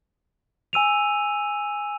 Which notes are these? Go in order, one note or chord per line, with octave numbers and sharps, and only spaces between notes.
G#5 E6 D#7 F7